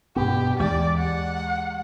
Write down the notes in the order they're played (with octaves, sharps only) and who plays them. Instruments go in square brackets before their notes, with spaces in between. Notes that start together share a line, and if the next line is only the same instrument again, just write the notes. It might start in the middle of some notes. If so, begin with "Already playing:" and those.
[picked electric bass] G2 B2 B3 [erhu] G4
[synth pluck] D#2 E3 G4 [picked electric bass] G#3 [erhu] D5
[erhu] F#5